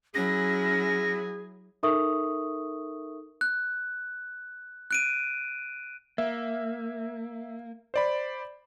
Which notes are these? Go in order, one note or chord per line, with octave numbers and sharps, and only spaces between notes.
F#3 C#4 E4 G#4 A#6
D#4 A4 A#4 E5 C#6 D#6
F#6
F#6 D7 D#7
A#3 E5
C5 D5 B5